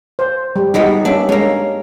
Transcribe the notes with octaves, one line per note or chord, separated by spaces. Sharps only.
C5
G3
G3 G#3 B3 D#4 F#4
A#3 C#4 D4 E5
G#3 A#3 C#4